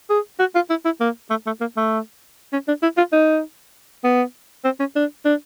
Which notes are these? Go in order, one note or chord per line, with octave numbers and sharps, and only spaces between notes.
G#4
F#4
F4
E4
E4
A#3
A3
A3
A#3
A3
C#4
D4
E4
F4
D#4
B3
C4
C#4
D4
D4